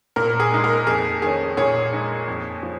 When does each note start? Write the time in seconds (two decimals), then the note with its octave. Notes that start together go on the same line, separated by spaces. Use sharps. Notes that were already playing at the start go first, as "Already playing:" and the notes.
0.16 A#2 A#4
0.40 G#4
0.51 G#3 D#4
0.64 A#4
0.87 F2 G#4
1.22 D#3 C#4 G#4
1.57 A#2 G#4 C#5
1.93 G#3 D#4
2.28 F2
2.63 F3